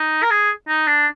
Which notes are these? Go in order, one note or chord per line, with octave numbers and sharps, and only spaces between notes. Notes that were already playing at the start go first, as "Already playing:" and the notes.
Already playing: D#4
A#4
G#4
D#4
D4